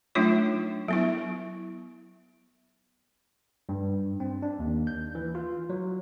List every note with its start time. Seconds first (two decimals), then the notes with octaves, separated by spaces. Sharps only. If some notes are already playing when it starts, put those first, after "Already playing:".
0.15 F#3 A3 D4 D#4 F4 C#5
0.88 F#3 B3 E4
3.69 G2
4.20 C4
4.42 D4
4.59 D#2
4.87 G6
5.15 E3
5.35 F4
5.70 F#3